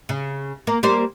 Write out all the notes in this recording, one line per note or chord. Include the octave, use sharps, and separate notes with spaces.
C#3
A#3
G3 A#3 C5